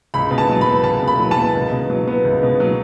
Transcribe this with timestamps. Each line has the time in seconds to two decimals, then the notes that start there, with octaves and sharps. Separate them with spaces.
0.14 C#2 B5
0.31 B2
0.38 A5
0.49 F#3
0.61 B5
0.66 B3
0.84 C#2 A5
1.02 B2
1.08 B5
1.20 F#3
1.31 A5
1.37 B3
1.55 C#2
1.72 B2
1.90 F#3
2.07 B3
2.25 C#2
2.43 B2
2.60 F#3